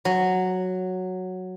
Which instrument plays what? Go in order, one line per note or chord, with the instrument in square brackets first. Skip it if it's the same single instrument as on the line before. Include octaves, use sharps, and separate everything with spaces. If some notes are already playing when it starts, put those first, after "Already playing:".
[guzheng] F#3